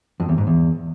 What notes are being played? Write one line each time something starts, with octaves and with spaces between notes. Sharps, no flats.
F2
E2
G#2
E2